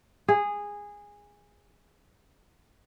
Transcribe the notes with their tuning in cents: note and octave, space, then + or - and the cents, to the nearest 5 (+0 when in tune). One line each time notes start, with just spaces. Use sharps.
G#4 -15